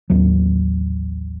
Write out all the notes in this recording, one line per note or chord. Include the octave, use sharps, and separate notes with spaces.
A1 D#2 F#3